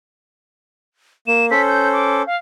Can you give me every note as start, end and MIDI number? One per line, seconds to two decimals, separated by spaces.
1.27 1.51 58
1.27 1.46 100
1.51 2.22 61
1.51 2.22 69
1.51 2.22 72
1.51 1.62 95
1.68 1.91 91
1.93 2.25 86
2.27 2.36 77